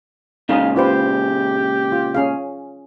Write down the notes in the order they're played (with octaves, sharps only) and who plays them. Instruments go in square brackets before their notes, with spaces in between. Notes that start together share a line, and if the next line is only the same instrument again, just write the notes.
[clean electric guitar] A#2 C#3 G#3 [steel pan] D#4 D#6 [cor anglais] F5
[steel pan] F4 B4 C5 [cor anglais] G4
[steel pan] F4
C#4 G#4 F5